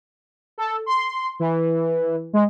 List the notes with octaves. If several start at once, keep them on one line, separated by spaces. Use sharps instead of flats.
A4
C6
E3
G#3